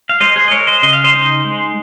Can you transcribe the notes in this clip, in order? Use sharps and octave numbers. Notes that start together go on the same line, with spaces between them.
F5
G#3 C5 D#5
G#4 C5
D#5
G#3 A#4 C#5
C5 D#5
C#3 D#5
F5
C5 D#5
D#4
G#3